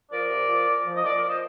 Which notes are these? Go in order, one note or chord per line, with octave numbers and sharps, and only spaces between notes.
F3 A#4 D5
C3
F3
A#2
F3
D#5
A#2 A#4 D5
A#4 D5
F3
C5 D#5